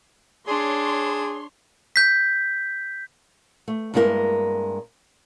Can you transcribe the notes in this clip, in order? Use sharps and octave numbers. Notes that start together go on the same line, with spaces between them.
D4 G#4 C#5 C6
G6 B6
A3
G2 G#3 A#3 E4 G4 A#4